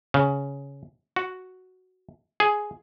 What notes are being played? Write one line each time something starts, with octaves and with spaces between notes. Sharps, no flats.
C#3
F#4
G#4